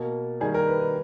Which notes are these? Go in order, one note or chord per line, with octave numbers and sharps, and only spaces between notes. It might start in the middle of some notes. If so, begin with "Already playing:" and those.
Already playing: B2 A#3
D#3 G3 A#3 G#4
A#4
B4
B4